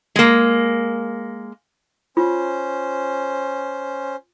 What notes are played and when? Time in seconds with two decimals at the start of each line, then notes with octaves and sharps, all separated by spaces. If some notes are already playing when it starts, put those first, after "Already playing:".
0.16 G#3 A#3
2.17 C#4 F4 C5